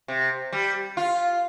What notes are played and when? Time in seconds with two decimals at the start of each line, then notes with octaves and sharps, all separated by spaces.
0.08 C3
0.52 G3
0.97 F4